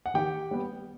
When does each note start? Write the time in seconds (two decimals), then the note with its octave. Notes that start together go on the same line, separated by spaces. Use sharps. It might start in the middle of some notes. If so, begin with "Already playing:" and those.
0.06 F#5
0.14 D#3 G4 G5
0.51 G3 B3